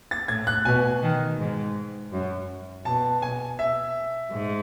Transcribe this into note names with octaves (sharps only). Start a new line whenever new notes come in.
A6
A2 G#6
F#6
B2 G#5
D#3
G#2
F#2
B2 A5
G#5
E5
G#2